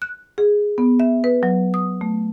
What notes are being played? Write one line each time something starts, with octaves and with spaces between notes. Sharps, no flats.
F#6
G#4
B3
E5
B4
F#3
D#6
A3